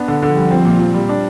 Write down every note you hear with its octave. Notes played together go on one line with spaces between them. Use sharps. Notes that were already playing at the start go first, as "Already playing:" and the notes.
Already playing: B3 D4
D3
D3 F3
G3
C4
A#2
A#2
G3
D4